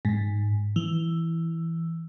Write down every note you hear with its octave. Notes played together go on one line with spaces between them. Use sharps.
G#2
E3